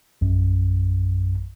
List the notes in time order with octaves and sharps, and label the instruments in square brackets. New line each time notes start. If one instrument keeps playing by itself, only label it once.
[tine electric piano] A#1 F#2